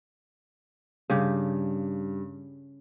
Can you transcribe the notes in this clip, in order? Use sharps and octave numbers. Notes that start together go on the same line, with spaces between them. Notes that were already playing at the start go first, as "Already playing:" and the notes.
G2 C#3 G4